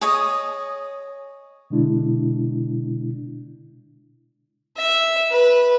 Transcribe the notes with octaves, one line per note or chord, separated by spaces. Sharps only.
G#4 C#5 D#5
B2 D3 G#3 D4 E4
E5
B4